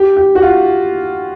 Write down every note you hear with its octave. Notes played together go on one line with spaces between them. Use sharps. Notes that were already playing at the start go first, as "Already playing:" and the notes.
Already playing: G4
G4
F#4
F4